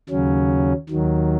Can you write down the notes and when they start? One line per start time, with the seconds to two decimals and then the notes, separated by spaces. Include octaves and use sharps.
0.09 D#2 C#3 F#3 C#4
0.89 D#2 D#3 F#3